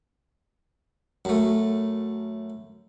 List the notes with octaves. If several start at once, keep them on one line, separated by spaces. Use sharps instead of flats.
F#2 A3